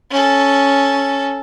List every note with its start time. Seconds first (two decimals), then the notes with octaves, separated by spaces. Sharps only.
0.10 C#4 A4